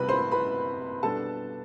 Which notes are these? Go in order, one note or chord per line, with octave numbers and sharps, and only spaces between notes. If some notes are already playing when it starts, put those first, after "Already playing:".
Already playing: C3 G3 B3 B4 B5
C5 C6
B4 B5
B2 G3 B3 D4 A4 A5